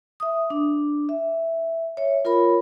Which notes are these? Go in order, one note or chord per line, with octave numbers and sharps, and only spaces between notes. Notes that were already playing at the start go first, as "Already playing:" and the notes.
E5 D#6
D4
E5
C#5 E5
F4 A#4 C#5 B5